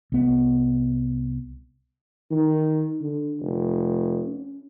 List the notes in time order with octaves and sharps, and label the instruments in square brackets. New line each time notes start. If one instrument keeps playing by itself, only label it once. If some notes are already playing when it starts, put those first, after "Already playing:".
[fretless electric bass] C2 B3
[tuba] D#3
D3
F1
C#4